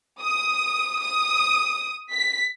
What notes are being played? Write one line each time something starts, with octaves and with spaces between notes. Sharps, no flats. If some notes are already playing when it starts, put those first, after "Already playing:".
D#6
D#6
B6